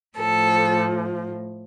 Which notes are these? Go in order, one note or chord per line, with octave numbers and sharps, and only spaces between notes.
A2 F3 A4